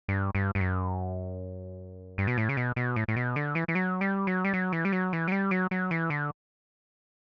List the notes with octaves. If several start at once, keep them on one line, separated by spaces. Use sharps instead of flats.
G2
G2
G2
F#2
G2
B2
A2
C#3
B2
B2
A2
A2
B2
D3
E3
E3
F#3
G3
F#3
G3
F#3
E3
G3
F#3
E3
F#3
G3
F#3
F#3
E3
D3